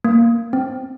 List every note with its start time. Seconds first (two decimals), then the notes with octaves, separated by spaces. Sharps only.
0.04 A#3
0.53 C4